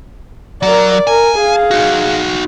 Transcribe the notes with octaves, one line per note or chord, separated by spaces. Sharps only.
F#3 A#4 D5
A#4 G#5
G#4 F5
D#4 F#4